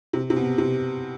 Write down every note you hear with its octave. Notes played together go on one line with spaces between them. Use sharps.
C3
C3
B2
C3